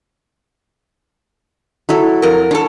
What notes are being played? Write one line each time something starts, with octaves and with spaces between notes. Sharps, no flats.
F#3 E4 A4
F2 A#4
D4 A4 C#5